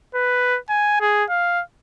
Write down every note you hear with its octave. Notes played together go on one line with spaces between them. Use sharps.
B4
G#5
G#4
F5